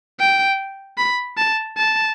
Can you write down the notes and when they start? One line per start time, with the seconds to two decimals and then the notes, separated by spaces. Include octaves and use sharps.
0.19 G5
0.98 B5
1.38 A5
1.77 A5